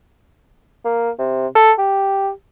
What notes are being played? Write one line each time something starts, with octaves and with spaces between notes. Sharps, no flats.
A#3
C3
A4
G4